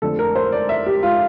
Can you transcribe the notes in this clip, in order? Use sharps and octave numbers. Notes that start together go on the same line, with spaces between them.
F2 D3 A3 A4
A#4
C5
D5
E5
G4
F4